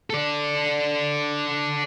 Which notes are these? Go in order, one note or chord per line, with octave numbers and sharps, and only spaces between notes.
A4 D5